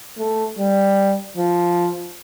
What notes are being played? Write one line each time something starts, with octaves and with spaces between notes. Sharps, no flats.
A3
G3
F3